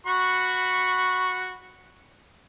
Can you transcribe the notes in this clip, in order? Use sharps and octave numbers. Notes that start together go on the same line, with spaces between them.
F#4 B5 C#6